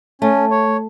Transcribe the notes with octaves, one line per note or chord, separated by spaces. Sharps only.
A3 C#4
C#5